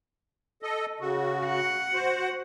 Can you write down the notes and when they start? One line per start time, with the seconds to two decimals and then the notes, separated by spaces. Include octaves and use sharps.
0.62 A4 D#5
1.00 C#3 F#4
1.46 F#5
1.93 F#4 C5